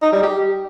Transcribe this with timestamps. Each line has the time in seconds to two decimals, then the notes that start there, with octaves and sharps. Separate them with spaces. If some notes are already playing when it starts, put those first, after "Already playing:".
0.02 D#4
0.12 G3
0.23 G4